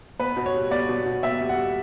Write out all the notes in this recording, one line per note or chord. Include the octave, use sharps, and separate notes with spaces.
B3 B4
B2
C#5
G3
B3 D5
B2
B2
B3 E5
G3
F#5
G3